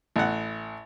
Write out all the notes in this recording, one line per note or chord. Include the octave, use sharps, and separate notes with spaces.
A1 F#5